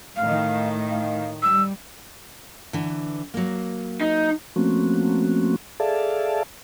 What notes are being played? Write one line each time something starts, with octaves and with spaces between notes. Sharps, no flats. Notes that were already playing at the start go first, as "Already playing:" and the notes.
A2 D#3 F5
F5
G3 E6
D3 E3
F#3 A#3
D#4
F3 A3 A#3 C4 C#4 F#4
G#4 A4 D5 E5 F5 A5